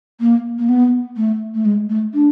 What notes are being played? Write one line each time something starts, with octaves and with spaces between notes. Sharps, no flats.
A#3
A#3
B3
A3
A3
G#3
A3
D4